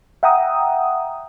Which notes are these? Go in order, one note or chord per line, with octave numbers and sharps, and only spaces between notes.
E5 F#5 G5 A#5 D#6